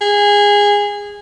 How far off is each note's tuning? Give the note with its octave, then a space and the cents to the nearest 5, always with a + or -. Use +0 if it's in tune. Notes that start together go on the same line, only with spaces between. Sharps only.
G#4 -20